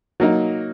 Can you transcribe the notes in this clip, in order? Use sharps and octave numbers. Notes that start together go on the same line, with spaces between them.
F#3 A#3 D#4